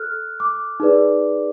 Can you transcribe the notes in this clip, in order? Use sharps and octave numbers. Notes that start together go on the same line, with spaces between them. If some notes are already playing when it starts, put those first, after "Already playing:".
Already playing: A4 F6 F#6
D6
D#4 G#4 B4 D5